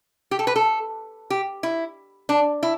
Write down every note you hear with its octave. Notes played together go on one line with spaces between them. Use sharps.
G4
A4
B4
A4
G4
E4
D4
E4